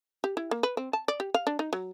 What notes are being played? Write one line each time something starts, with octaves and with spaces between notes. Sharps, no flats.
G4
E4
A#3
B4
C4
A5
D5
G4
F5
D4
D#4
F#3